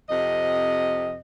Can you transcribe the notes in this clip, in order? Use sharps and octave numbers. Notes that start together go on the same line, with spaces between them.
F2 C3 D#5